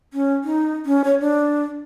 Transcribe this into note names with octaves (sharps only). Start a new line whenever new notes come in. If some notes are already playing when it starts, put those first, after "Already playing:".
C#4
D#4
C#4
C#5
D4